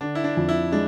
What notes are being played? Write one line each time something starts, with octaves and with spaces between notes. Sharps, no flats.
D3 D4
E4
D4
F2
E4
G#3 D4